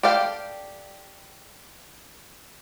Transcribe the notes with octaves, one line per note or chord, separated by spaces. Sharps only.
G4 A4 D5 F5 G5